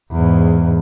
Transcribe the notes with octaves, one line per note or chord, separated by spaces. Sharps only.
E2 G#2